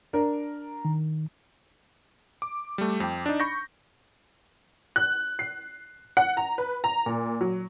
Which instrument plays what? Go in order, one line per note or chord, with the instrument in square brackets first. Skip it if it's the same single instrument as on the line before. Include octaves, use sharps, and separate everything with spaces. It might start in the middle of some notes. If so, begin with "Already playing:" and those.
[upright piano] D4 A#4
[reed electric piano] D#3
[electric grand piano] D6
G3 A3
F2 G5
D4 D#4
B5 C#6 G6 A#6
[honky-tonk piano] F#6
C7
F#5
A#5
B4
A#5
A#2
F#3